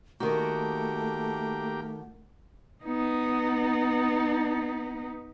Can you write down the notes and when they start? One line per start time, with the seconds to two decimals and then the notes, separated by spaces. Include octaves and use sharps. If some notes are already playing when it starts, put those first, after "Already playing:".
0.20 D#3 A3 A#3 F#4 G4
2.85 B3 D#4